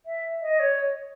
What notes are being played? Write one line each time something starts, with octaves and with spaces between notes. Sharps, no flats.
E5
D#5
C#5